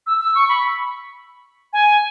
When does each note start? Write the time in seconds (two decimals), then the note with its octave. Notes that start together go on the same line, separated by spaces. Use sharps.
0.07 E6
0.21 E6
0.35 C#6
0.49 B5
1.73 G#5